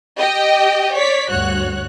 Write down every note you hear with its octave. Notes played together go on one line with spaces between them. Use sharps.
G4 D#5 G5
C#5 D5 B6
D2 G2 F#4 C#5 F#6